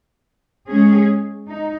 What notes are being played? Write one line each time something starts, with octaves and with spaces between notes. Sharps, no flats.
G#3 C#4 G#4
D#4